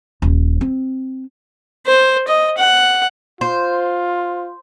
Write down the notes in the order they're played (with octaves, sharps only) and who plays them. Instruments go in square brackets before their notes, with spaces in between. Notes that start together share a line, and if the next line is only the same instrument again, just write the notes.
[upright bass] D#1
C4
[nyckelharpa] C5
D#5
F#5
[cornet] F4 [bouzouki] C5